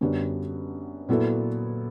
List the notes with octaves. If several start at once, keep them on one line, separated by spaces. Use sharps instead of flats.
F#2 D3 G3 B3 D4
A#2 F#3 B3 E4 A4